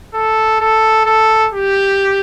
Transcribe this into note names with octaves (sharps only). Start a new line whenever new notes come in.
A4
A4
A4
G4